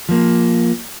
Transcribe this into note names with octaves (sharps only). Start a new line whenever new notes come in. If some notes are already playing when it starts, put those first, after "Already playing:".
F3 A#3